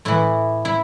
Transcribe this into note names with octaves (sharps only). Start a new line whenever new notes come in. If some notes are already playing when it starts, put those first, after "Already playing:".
A2 E3 E4
E4